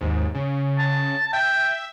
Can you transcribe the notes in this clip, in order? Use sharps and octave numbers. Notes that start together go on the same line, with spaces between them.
D#2 G#2
C#3
A5
E5 G5